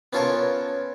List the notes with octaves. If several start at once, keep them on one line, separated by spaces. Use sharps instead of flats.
B3 C#4 F4 A4 A#4 C#5